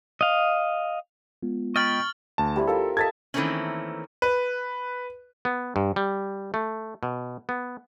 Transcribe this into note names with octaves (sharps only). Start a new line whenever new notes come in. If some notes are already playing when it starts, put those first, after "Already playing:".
D#5 F5
G#3 B3 F4
D#5 G5 B5 C#6 F6 A6 F#7
D2 A5
G3 C4 E4
F4 A4 A#4 E5
A4 D#5 A5 G#6 A6 B6
D#3 E3 A3 A#3 C4 C#4
B4
B3
G2
G3
A3
B2
B3